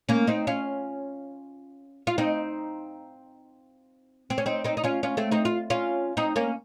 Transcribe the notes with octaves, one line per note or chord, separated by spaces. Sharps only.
A#3 C#4
C4 D#4
C#4 F4
F4
C4 D#4
C4
C#4
C4 D#4
C4 D#4
D#4
C#4 F4
C#4 F4
A3 C4
C4 D#4
F4
C#4 F4
C4 D#4
A#3 C#4